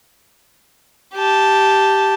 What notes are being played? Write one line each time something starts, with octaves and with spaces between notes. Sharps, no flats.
G4 A5